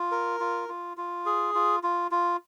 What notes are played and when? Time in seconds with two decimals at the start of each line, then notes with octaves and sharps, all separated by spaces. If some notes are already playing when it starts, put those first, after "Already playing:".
Already playing: F4
0.11 A#4
0.40 F4
0.69 F4
0.97 F4
1.26 G#4
1.55 F4
1.83 F4
2.11 F4